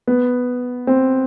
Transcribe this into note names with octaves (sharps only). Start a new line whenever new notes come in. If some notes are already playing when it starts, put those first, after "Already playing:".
B3
C4